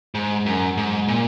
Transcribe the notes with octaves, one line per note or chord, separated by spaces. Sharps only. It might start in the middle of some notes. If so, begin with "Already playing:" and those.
G#2
F#2
G#2
A#2